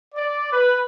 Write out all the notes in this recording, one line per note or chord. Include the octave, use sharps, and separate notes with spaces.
D5
B4